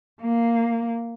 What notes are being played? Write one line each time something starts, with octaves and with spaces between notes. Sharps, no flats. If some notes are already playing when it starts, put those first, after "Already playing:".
A#3